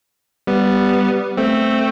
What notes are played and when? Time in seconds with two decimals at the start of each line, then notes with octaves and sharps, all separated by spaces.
0.47 G3 B3
1.37 A3 C4